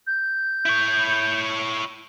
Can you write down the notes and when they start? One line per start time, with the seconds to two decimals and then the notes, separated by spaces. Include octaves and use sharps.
0.07 G6
0.66 E4 C#5